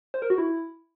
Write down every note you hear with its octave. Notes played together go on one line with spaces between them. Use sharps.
C5
A#4
F#4
E4